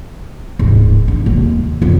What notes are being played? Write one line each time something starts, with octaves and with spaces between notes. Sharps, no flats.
D1 G#2
D4
D#2 G#3
F2